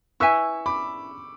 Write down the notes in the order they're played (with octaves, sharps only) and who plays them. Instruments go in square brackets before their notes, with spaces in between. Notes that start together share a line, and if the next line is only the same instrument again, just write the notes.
[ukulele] E4 B4 E5 G#5 [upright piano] C#6 E6
[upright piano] B5 D6